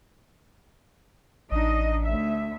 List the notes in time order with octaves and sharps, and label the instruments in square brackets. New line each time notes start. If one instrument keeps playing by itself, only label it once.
[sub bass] A1 [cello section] D4 D#4 D#5
[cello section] D2 E5